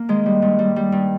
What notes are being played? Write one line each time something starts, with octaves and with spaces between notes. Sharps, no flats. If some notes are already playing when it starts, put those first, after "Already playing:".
Already playing: A#3
D#3 G#3
G3
G2
G3
G3
G2